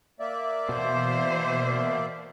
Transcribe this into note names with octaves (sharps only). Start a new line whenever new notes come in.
A#3 D5 E5
B2 E3 C5